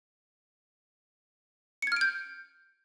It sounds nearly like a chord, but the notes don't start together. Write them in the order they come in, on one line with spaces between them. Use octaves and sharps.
C#7 G#6 F6 D7 G6